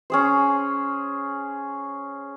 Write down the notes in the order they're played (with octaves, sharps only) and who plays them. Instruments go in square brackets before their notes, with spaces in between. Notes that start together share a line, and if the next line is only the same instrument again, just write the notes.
[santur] C#4 G#4 C5